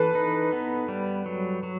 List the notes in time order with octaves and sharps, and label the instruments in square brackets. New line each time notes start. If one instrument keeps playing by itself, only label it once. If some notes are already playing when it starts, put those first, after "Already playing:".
Already playing: [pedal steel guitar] E3 [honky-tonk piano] A4 B4
[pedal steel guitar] D#4
B3
G3
F#3
F#3